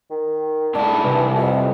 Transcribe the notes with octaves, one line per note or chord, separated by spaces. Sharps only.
D#3
G#2 D4 E4 A5
C2 E3
F2 E5